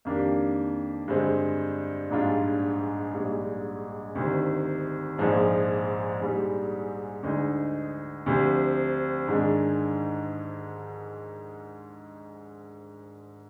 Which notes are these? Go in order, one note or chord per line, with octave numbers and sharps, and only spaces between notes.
F2 D#3 A#3 D4 G4
G2 D3 G#3 C4
A#1 G#2 G3 D4 F4
A#1 G#2 G3
D2 C3 D#3
A#1 G#2 F3 G#3
A#1 G#2 G3
D2 D3 G#3 D#4
D2 C3 F3
G#2 D#3 G#3 D4